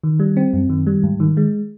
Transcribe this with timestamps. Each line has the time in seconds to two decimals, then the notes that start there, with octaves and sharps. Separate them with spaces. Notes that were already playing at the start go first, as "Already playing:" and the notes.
0.04 D#3
0.20 G3
0.37 C4
0.53 F#2
0.69 D#3
0.87 G3
1.03 G#2
1.20 D#3
1.37 G#3